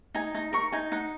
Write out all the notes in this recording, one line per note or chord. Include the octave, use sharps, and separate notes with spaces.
D#4 G#5
D#4 A#5
A#4 C#6
D#4 G#5
D#4 F#5